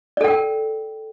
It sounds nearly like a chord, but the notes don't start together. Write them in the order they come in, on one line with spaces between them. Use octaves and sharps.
D5 A4 G5 A#4